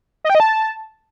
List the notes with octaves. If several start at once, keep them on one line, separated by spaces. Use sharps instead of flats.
D#5
G5
D#5
A5